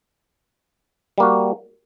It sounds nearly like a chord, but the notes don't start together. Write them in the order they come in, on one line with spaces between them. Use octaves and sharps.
G3 A#3 F#4